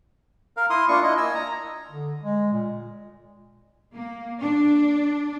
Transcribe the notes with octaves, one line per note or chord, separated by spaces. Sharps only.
A#4 F5
E4 C6 D#6
A#3 D4 F4 C#6
E4 D#5
G#5 E6
A#5
D3
G#3
A#2
A#3
D4